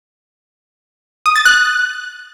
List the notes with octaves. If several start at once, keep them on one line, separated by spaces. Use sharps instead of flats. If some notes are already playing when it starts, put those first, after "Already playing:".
D#6
A6
F#6